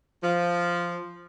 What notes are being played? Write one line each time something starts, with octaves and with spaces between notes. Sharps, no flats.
F3